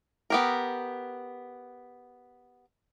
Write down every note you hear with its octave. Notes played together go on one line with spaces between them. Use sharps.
B3 G4 A#4